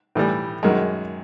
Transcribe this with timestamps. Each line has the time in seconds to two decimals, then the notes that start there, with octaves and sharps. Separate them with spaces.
0.15 A2 E3 G3
0.63 F#2 D#3 G#3